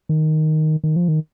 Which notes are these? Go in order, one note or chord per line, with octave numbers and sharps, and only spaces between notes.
D#3
D#3
F3
D#3